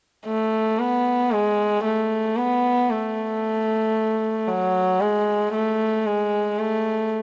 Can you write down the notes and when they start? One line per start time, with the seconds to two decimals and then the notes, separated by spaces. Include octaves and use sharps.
0.26 A3
0.79 B3
1.31 G#3
1.84 A3
2.37 B3
2.90 A3
4.48 F#3
5.00 G#3
5.53 A3
6.06 G#3
6.59 A3